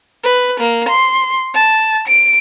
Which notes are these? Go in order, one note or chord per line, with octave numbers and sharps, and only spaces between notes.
B4
A#3
C6
A5
D7